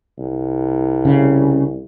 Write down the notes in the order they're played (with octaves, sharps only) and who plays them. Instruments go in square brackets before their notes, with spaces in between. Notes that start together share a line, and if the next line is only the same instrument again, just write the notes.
[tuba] C2
[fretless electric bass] C#3